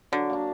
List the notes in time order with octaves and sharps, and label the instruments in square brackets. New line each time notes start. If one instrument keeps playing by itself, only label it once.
[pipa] D3 [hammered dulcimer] F#3
[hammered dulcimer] A#3 D4